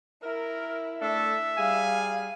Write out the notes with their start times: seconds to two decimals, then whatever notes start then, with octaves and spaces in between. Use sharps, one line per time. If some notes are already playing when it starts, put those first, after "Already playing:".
0.23 E4 A#4
1.01 A3 D4 A4 E5
1.58 G3 G#4 F5 G#5